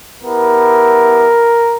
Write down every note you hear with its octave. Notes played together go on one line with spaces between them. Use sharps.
B3 E4 G4 A#4